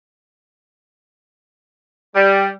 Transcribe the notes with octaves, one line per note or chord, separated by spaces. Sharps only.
G3